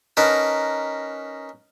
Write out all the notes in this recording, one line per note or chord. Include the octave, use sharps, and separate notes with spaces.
C#4 D#4 A#4 B4 A5